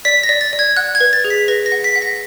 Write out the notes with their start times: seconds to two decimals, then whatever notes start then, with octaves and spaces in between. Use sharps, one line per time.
0.05 D5 B6
0.23 A#6
0.29 D5
0.41 A6
0.53 D5
0.59 G#6
0.76 F#5 F#6
0.95 G#6
1.00 B4
1.13 A6
1.24 G#4
1.30 B6
1.48 B4 A#6
1.66 A#6
1.72 F#5
1.84 B6
1.95 F#5
2.02 A#6